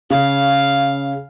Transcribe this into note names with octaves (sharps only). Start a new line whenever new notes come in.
C#3 F5